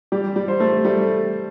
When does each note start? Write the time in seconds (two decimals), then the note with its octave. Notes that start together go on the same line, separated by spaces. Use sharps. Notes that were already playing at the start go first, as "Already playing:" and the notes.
0.12 G3 G4
0.36 G3
0.48 C5
0.60 A3
0.84 G3 A3